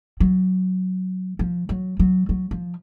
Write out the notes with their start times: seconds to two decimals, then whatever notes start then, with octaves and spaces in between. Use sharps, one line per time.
0.20 F#3
1.39 F3
1.69 F#3
1.99 F#3
2.29 F#3
2.51 F3